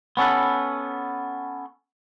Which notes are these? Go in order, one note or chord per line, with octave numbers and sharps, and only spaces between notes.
B3 C#4 A4 B4